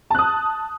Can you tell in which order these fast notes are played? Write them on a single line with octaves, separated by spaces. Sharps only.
A5 F#6 D#6